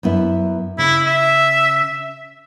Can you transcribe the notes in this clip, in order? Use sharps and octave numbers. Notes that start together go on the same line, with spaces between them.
F#2 B3 E4
C#3 E4
E5